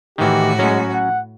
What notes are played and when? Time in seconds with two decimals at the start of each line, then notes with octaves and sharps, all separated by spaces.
0.18 A2 D#3 E3 F#4 G4
0.59 F#3 G#3 C#4
0.93 F#5